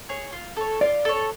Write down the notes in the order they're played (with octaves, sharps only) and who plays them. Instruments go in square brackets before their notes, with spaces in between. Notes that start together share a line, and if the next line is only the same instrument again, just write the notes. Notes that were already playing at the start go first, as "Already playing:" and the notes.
[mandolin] G#4 C#5
F4
A4 C#5
[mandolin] F4 [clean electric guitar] D5
[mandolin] A4 C#5